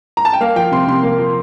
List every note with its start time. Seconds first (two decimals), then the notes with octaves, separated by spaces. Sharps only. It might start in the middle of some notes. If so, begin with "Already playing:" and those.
0.17 A#5
0.25 A5
0.33 G5
0.41 A#3 F5
0.56 F3 G5
0.72 C3 C6
0.88 C3 C6
1.03 A#3
1.19 F3